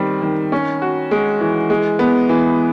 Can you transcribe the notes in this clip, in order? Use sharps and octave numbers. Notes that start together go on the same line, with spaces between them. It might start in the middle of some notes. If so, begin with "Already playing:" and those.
Already playing: D#3 G3 C4
D#3
C#4
F#4
G#3
E3
G#3
B3
E3